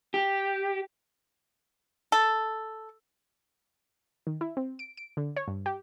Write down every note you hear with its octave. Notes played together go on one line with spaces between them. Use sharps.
G4
A4
D#3
E4
C4
D7
D7
D3
C#5
G2
G4